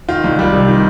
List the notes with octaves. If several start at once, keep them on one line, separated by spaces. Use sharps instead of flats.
D#3 F4
C2
G3
C3
D#3